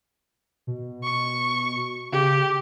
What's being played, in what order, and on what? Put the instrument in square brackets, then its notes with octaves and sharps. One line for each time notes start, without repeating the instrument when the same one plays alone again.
[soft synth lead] B2
[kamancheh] C#6
[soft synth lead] C#3 [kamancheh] G4